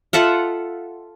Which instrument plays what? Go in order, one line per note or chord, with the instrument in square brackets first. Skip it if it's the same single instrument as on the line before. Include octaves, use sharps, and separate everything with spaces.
[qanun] F4 A4 E5 F#5